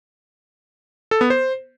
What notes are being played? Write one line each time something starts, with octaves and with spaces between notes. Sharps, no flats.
A4
B3
C5